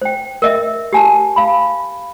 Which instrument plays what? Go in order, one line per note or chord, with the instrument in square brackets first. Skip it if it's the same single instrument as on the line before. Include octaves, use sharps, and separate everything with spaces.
[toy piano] C5 G5
A#4 D#5 E5
G4 G#5 A5
F5 B5